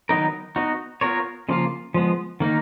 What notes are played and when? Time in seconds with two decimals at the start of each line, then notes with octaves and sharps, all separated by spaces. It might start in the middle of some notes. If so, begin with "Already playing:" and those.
0.09 D#3 F#3 B3 D#4 A#4
0.56 B3 D#4 F#4
1.01 B3 F4 A#4 C#5
1.49 C#3 F3 A#3 F4
1.94 F3 G#3 B3
2.40 D#3 A#3 D#4